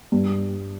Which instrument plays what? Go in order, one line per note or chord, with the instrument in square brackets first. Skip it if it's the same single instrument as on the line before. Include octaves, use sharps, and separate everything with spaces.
[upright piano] G2